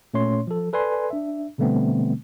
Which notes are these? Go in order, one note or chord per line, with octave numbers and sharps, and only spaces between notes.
A#2 A3 C#4 C#5 C6
F3 A4
A4 B4 D5 G#5 C6
D4 E5
B2 D3 G3 A3 B3 C4